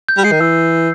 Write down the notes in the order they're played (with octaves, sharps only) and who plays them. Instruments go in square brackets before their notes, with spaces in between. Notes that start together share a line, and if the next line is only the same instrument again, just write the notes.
[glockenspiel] G6
[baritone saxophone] G3
[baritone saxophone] G#3 [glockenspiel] C7
[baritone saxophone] D#3
[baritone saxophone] E3 [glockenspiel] E6